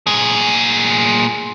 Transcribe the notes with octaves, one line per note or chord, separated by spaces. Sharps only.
A#2 G#4